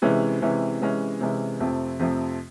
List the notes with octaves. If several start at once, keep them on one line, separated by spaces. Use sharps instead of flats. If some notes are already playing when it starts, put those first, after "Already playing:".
C3 E3 G#3 C#4 E4
C3 E3 G#3 C#4 E4
C3 E3 G#3 C#4 E4
C3 E3 G#3 C#4 E4
F2 C3 F3 A3 C4
F2 C3 F3 A3 C4